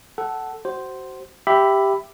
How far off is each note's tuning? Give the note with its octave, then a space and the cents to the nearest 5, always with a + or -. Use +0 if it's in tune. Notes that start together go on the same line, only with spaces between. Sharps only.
A4 -5 F#5 +20
F#4 +25 C5 +0
G4 +0 E5 +0 B5 +10